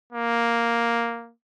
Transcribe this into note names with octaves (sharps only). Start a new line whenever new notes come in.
A#3